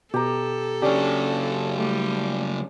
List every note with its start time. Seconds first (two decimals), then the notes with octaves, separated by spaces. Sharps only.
0.14 B2 G4 A4 A#5
0.82 C#3 F#3 C#4 D4 G4
1.78 G3 A3